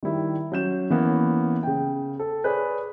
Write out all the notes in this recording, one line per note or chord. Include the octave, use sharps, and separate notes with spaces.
D#3 G3 E4
F#3 C#4 G6 E7
E3 A#3 B3 C#4
C#3 G5
A4
G#4 B4 C#5 D5 G#5